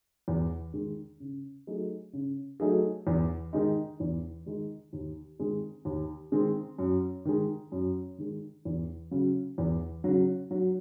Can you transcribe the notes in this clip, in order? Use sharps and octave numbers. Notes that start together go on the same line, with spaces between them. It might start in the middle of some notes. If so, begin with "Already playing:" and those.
E2
D#3 G#3
C#3
F#3 A3 D#4 G#4
C#3
F#3 A3 D#4 G#4
E2
D#3 G#3 D#4
E2
D#3 G#3 D#4
D#2
D#3 G#3 C4
D#2
D#3 G#3 C4
F#2
D#3 G#3
F#2
D#3 G#3
E2
C#3 F#3
E2
C#3 F#3
F#3